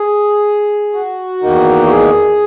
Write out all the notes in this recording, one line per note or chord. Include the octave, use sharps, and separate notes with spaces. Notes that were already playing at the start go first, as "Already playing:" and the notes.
Already playing: G#4
F#4
E2 D#3 A#3 D#4
F#4
G#4